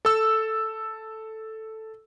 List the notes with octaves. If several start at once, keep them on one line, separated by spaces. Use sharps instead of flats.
A4 E6